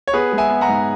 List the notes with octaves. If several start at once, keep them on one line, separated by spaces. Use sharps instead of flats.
C#5
B3 G#4 B4
G#3
E5 G#5
B3
F#5 A#5
G#2